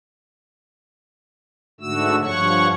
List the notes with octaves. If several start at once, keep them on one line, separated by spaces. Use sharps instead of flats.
G#2 D3 A3 F#4 E6
G2 F3 C#5 F#5 C#6